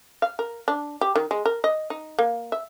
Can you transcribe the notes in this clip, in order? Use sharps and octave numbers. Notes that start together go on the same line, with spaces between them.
F5
A#4
D4
G4
D#3
G#3
A#4
D#5
D#4
A#3
E5